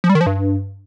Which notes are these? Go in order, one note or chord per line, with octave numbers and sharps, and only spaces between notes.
F3
G3
D#3
F3
G2